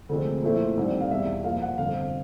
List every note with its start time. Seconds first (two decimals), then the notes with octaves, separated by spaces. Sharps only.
0.09 D2 C3 F3 G#3 C4
0.43 A#2 F3 A3 C4 E4
0.76 C2 C3 D#3 G3
1.01 F5
1.10 E2 B2 G3 E5
1.44 A#2 F3 A#3 F5
1.62 F#5
1.78 G1 F2 C3 F5